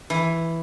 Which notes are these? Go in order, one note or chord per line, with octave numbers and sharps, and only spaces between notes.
E3